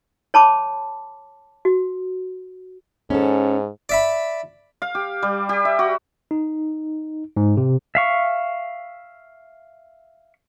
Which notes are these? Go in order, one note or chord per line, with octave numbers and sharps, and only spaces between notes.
C#5 A5 B5 D6
F#4
G#2 C#4 A4
D5 E5 B5
F5
G4
G3
G4
E5
F#4
D#4
G#2
C3
E5 F5 C#6